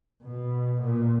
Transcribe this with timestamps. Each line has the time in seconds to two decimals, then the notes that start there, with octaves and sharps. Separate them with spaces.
0.23 B2
0.82 A#2